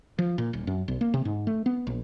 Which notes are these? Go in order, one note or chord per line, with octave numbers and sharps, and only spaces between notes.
F3
A#2
D#1
F#2
B1
A#3
C3
G#2
A3
B3
A#1